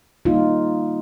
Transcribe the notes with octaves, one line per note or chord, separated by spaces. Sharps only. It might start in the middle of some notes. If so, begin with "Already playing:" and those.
D#3 G3 A#3 D#4 F4